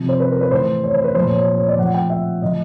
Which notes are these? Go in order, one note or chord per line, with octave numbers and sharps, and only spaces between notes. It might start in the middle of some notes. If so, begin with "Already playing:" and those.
Already playing: C3 F3
C5
B4
A#4
B4
A2 E3 C5
C#5
C5
B4
A#2 F3 C5
C#5
C#5
C#5
D5
A2 F3 F#5
G5
E5
A2 F3 D#5